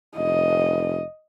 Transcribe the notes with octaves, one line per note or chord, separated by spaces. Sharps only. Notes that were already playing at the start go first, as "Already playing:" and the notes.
F1 D#5